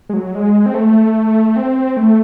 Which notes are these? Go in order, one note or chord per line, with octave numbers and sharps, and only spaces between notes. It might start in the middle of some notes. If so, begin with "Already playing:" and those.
G#3
F#3
G#3
C4
A3
C4
A3